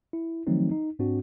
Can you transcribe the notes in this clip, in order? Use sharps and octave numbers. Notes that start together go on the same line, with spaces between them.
E4
D#3 F3 F#3 A3 C4 D#4
D#4
G#2 C4 D4 F#4